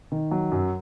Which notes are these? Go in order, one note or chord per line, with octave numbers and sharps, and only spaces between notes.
D#3
F#3
F#2